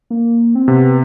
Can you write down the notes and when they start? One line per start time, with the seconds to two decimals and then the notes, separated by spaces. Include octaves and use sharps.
0.10 A#3
0.55 C4
0.67 C3 B3